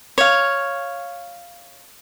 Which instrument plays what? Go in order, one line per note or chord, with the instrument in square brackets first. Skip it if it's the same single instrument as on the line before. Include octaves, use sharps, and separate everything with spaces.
[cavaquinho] C#5 F5